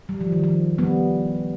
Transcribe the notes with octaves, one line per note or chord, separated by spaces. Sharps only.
G3
F3
D#3
F3
G3 B3